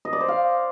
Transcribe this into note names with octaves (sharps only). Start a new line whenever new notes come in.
D#5
D5
C5
F5